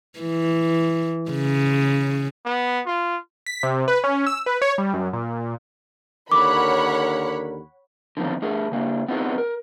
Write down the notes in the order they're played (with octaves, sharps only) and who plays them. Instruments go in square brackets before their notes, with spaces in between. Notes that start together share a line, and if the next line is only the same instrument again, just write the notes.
[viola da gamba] E3
C#3
[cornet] B3
F4
[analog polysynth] B6
C3
B4
C#4
E6
B4
C#5
G3
F#2
A#2
[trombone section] D#2 D3 A#4 [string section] C#5 F#5 B5 [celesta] D6
[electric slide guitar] D3 D#3 F3 B3 C4
A3 D4 G#4 A#4
C#3 A#3 D4
B3 C4 D#4 F4 G#4 B4
A#4